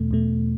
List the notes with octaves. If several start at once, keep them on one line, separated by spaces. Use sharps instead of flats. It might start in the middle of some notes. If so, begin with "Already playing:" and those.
Already playing: E2 B2 A3
E2 B2 A3